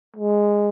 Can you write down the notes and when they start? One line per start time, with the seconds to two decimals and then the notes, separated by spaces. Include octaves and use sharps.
0.16 G#3